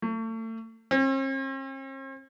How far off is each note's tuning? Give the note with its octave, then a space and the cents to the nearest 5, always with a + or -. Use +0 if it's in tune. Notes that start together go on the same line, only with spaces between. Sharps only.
A3 +35
C4 +45